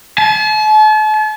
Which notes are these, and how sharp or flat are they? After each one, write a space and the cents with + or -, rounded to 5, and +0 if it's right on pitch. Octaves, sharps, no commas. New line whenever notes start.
A5 -40